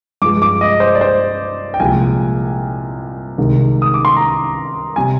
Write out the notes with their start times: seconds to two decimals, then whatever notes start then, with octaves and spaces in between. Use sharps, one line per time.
0.22 G2 F3 G#3 D6
0.42 D6
0.61 D#5
0.80 C5
0.95 D5
1.01 C5
1.74 G5
1.80 C2 A#2 F3 G#3 G#5
3.38 C2 C3 D#3 G#3
3.82 D#6
3.94 D6
4.05 C6
4.16 A#5
4.96 C3 G3 G#5